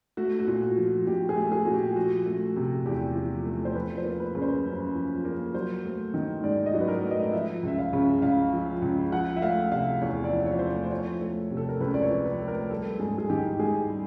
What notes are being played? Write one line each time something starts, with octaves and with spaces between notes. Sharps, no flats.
A3 F#4
F#4
A#2
F#4
F3
A#2 G4
G#4
A3
G#4
A#2 F#4
G4
F3 F#4
A3
C3
E2 G4
F3
A3
C5
F3 B4
C5
A#3
B4
C#3
C5
F#2
F3
A#3
F#3 C5
A3
D#3
G#2 D5
D#5
F#3
B4
A#4
A3
D#5
D#5
F3 E5
C#2 E5
F5
C#3
C#2 F5
F3
C#2
F3 F#5
E5
A3 F5
C3 F5
E2 C#5
D5
F3
C#5
A3 C5
C#5
C5
F3 C#5
A3
C3
A4
A#4
C#2 B4
D5
C#5
F3
B4
A3
A#4
G3 A4
G#2 G#4
G#4
D#3 G4
G#2 G#4
G3